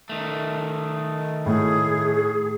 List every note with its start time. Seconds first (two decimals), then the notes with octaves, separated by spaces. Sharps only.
0.09 D#3 A3
1.46 A2 G#4